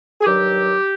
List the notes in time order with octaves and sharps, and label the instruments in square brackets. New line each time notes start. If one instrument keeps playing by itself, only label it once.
[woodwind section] G#4
G2 D#3 F#3 G4